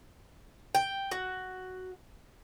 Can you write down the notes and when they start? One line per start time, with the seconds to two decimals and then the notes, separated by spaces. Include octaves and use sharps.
0.75 G5
1.11 F#4